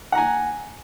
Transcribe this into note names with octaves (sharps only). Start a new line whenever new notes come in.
F#5 G#5 A#5